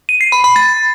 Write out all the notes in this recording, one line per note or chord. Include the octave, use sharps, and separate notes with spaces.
D#7
C7
B5
B5
A6